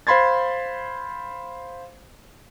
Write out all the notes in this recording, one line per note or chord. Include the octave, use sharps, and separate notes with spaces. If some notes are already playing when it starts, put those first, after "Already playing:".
C5 F5 B5 C6 G#6 A6